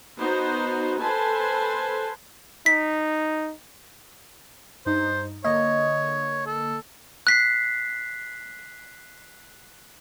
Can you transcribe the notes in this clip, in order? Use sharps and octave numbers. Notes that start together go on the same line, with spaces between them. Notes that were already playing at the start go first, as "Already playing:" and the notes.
B3 D#4 F#4 C5
A4 B4 C5 G#5 A5
D#4 B6
G2 D#4 C5
D3 A#3 C#5 D#5
A4
F#6 B6 C7